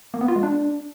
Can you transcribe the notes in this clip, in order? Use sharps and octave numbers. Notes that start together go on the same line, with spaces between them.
A#3
B3
F4
G#3
D4